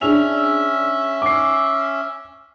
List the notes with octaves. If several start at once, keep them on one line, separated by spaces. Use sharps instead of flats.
C#4 D4 G#4 E5 F7
D6 C7